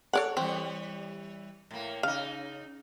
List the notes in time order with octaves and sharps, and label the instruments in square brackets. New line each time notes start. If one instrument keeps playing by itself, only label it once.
[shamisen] A4 D5 F#5 [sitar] C#5
[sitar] E3 G3 [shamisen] C4
[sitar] A2 A#3
[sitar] C#3 D#4 [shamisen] F5